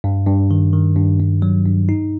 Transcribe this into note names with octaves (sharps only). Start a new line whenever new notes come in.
G2
G2
D#3
D#3
G2
G2
F#3
G2
D#4